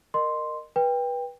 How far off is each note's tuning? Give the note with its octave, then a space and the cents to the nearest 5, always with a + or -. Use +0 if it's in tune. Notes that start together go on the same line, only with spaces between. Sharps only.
A#4 +0 D#5 -30 C6 +0
B4 -20 G5 +20